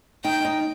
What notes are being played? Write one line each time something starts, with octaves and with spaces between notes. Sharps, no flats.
D#4 G5
D#4